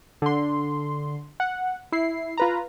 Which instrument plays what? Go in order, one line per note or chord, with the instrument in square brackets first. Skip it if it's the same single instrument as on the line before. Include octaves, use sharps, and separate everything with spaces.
[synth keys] D3 C6
F#5
E4 C7
F4 B4 A#5